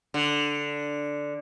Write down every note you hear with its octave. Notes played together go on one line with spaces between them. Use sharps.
D3